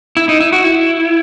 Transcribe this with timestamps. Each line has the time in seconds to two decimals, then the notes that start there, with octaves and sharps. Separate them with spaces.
0.17 E4
0.29 D#4
0.40 E4
0.52 F#4
0.64 E4